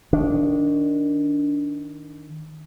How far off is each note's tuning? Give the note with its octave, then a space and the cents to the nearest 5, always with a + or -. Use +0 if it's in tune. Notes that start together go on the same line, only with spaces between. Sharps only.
D#3 +0 D4 -20